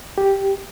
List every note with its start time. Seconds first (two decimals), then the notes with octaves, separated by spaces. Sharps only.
0.18 G4